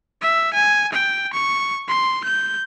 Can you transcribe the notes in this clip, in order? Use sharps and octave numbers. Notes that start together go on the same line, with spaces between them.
E5
G#5
G5
C#6
C6
G6